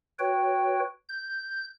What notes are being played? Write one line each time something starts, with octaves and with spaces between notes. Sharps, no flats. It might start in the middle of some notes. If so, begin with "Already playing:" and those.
F#4 B4 C#5 G5
G6